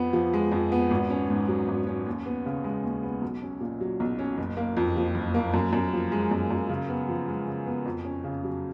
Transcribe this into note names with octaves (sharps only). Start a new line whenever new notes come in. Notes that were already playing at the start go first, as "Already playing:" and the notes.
Already playing: F2 B3
F3
G#3
F2
B3
G#1
C#4
G#2
F#3
G#1
C#4
D#2
B3
C#3
G#3
D#2
B3
B1
C#4
A#2
F#3
B1
C#4
F#1
A#3
F2
F3
F#1
A#3
F#2
F#2
F3
G#3
F#2
F#2
C#3
B3
F3
G#3
C#3
B3
F2
C#4
C#3
F#3